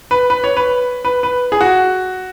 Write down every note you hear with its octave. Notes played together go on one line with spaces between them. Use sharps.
B4
B4
C#5
B4
B4
B4
G#4
F#4